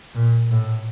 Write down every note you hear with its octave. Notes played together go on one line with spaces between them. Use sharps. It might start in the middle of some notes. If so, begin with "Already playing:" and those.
A#2
A2